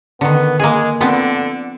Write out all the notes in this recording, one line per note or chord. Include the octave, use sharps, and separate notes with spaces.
D3 D#3 B3
G#3 A#3 G#4
D3 F3 B3 C4